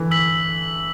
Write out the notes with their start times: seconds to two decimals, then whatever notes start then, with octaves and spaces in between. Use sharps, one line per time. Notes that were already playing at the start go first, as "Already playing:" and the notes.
Already playing: D3 E3
0.11 E6 B6 F#7